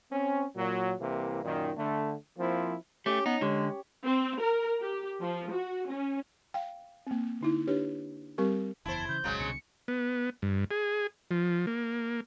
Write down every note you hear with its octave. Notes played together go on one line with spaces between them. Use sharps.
C4 C#4
A#2 F#3
C2 C3 E3 A#3
F#2 A#2 D#3
D3 A3
F3 A#3 C4 E4
A3 C#4 G4 G5
B3 D#4
D3 G#3 G4 C#5
C4
A#4
G4
F3
F#4
C#4
F5 G5
A#3 C4
D3 D#4 E4
D4 G4 B4 C#5
G3 C4 G4 A#4 C#6
F#1 E2 E4 C5 A5
C#3 E3 G6
G#1 C#2 C#3 F#3 G#3
C2 B2 D3 C#7
B3
G2
G#4
F3
A#3